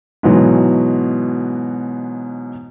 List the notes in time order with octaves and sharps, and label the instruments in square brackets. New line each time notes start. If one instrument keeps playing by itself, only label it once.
[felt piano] G#2 B2 E3 F#3